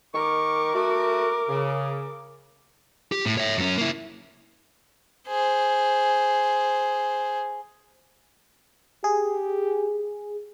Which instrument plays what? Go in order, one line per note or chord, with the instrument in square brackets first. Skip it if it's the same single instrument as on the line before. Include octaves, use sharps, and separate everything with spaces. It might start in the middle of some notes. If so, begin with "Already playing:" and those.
[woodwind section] D#3 C#6 [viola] A#4 D6
[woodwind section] A3 F#4
C#3
[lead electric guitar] G4
A2
C#5 E5
F#2 C#4
A#3 E4
[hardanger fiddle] G#4 C5
[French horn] G4 [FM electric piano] G#4